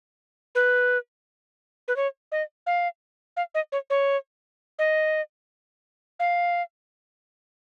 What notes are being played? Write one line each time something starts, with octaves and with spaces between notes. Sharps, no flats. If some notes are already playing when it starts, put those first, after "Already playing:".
B4
B4
C#5
D#5
F5
F5
D#5
C#5
C#5
D#5
F5